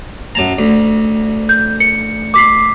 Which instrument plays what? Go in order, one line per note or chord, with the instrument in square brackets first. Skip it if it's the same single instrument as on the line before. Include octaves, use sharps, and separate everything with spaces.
[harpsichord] F#2 A5 A#5
D2
[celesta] G6
C#7
D6 B6 C7